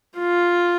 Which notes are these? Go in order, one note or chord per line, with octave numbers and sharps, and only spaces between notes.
F4